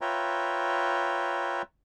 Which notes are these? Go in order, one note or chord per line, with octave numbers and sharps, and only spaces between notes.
F4 B4 C#5 E5 G5 A#5